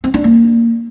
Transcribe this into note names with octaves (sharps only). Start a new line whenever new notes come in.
C4
D4
A#3